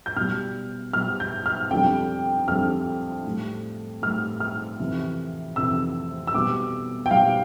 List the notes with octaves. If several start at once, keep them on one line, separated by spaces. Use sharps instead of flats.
G6
B2 G3 F6
B2 G3 F6
G6
F6
F2 D3 G3 G5
F2 D3 G3 F6
A2 G3
A2 G3 F6
F6
F2 C3 E3
F2 C3 E3 E6
E6
B2 G3 D6
G5
B2 G3 F5